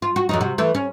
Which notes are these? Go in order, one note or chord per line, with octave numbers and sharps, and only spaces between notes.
F4
F#4
F2 F#3 D#4
C3 F#4
E3 A3
C#4